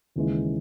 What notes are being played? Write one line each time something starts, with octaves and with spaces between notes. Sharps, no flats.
D#2 C#3 E3 G#3